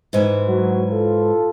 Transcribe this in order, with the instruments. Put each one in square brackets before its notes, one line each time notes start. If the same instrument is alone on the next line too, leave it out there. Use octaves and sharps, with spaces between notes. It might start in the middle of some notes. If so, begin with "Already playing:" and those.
[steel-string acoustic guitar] G#2 E3
[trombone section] F#3
F4 A4